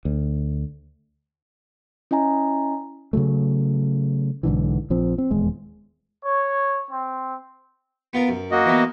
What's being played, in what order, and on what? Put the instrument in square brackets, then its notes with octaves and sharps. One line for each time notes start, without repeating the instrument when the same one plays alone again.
[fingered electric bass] D2
[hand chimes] C#4 E4 D#5 G#5 A#5
[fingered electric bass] C#3 E3 F#3 A3
B1 G#2 D3 E3
A#1 F3 C4
C4
D#1 E2 G#3
[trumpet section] C#5
C4
[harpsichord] B3 F4 A#4
F#2
[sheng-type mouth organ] A#3 F#4 D#5
[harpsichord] E3 B3